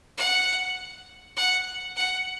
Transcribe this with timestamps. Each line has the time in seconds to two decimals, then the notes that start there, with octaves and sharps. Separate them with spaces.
0.18 F#5
1.36 F#5
1.96 F#5